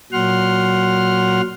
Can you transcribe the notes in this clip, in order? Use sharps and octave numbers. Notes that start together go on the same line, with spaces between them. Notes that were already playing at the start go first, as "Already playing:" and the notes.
A#2 F#3 F#5 C6 F6